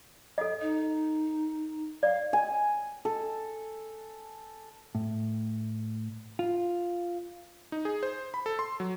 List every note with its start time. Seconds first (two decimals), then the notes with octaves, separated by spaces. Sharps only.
0.38 A4 D#5
0.62 D#4
2.03 D5 F5
2.33 G#5
3.05 A4
4.95 A2
6.39 F4
7.72 D#4
7.85 G#4
8.03 C5
8.34 B5
8.46 A4
8.59 C6
8.80 F#3